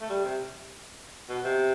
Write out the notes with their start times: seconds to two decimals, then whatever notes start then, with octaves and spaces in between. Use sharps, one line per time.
0.01 A3
0.10 G3
0.24 C3
1.29 B2
1.45 C3